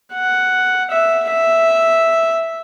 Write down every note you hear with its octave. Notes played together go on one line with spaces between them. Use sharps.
F#5
E5
E5